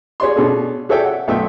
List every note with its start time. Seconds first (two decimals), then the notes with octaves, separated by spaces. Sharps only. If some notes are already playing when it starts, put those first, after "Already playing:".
0.20 G#4 C#5 D5 C6
0.36 B2 D4 G#4 A4
0.89 G#4 A4 C#5 D5 E5 G5
1.04 F#5
1.28 B1 A3 E5 G5